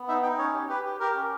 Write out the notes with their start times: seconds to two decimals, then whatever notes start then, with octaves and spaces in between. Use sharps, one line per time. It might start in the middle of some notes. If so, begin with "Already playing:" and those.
Already playing: B3
0.08 D#4 E5
0.23 D#4 G5
0.38 C#4 C#5
0.53 G4
0.69 G4 B4
0.85 G4
0.99 G4 A#4
1.15 C#4